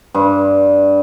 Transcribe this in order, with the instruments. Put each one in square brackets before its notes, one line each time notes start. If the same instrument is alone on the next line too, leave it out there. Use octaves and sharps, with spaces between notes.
[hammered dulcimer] G2